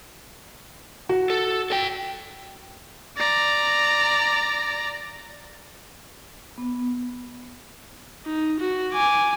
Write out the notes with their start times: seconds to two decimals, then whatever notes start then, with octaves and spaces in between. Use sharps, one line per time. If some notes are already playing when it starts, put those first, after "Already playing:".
1.09 F#4
1.30 A4
1.70 A4 G5
3.17 D5 A#5
6.58 B3
8.25 D#4
8.60 F#4
8.93 G#5 D6